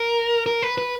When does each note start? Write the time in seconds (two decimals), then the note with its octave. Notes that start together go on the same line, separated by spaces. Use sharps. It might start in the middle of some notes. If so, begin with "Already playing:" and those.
Already playing: A#4
0.46 A#4
0.62 B4
0.78 B4